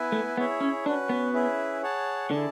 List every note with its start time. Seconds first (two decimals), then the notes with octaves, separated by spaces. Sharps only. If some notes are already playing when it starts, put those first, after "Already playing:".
Already playing: B3 E4 B4 E5 G#5
0.12 A3
0.37 B3 E4 G#4 C#5 E5
0.61 C#4
0.86 C#4 D4 F#4 B4
1.09 B3
1.33 C#4 E4 G#4 B4 E5
1.82 G#4 C#5 F#5 A5
2.31 D3 E4 G#4 D5 A5